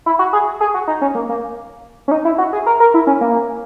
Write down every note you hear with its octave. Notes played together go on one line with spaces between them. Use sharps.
E4
F#4
G#4
G#4
F#4
D#4
C#4
A#3
A#3
C#4
D#4
E4
F#4
G#4
A#4
A#4
E4
C#4
A#3